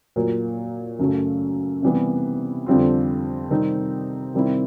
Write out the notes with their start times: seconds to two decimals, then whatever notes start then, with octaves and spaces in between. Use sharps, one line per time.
0.16 A#2 F#3 A#3
0.99 F#2 C#3 F#3 A3
1.82 C3 E3 G3 B3
2.66 F2 D3 G3 C4 F4
3.50 C3 D#3 G3 C4 D#4
4.34 C3 D#3 G3 C4 E4